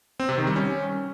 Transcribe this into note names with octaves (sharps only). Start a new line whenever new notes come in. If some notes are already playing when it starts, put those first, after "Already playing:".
C4
C3
D#3
G3
C#4